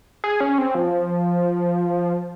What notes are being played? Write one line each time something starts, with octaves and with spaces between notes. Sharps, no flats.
G#4
C#4
C4
F3